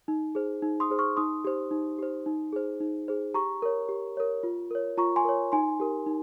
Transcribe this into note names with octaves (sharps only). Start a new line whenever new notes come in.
D#4
G#4 C5
D#4
C6 D#6
G#4 C5
C#6 F6
D#4 C6 D#6
G4 C5
D#4
G4 C5
D#4
G#4 C5
D#4
G#4 C5
G4 A#5 C#6
A#4 C#5
G4
A#4 C#5
F4
A#4 C#5
F4 A#5 C#6
G#5 C6
A#4 C#5
D#4 G#5 C6
G4 A#4
D#4